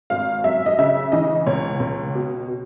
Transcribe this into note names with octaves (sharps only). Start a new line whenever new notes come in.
G#1 F5
F#2 E5
D#5
C#3 E5
E3 D#5
C#2 C#5
C#2
B2
B2